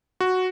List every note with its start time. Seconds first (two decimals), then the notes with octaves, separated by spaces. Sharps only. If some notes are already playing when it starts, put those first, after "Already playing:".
0.20 F#4